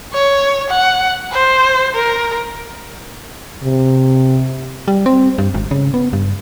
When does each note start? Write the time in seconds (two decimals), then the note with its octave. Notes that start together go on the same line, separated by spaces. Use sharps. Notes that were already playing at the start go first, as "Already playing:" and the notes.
0.13 C#5
0.69 F#5
1.32 C5
1.95 A#4
3.64 C3
4.88 G3
5.06 C4
5.38 G2
5.54 G#1
5.71 C#3
5.94 B3
6.13 G2